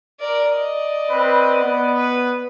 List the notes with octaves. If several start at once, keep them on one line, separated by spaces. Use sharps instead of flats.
A#4 D5
D5 D#5
C4 B4
B3
B4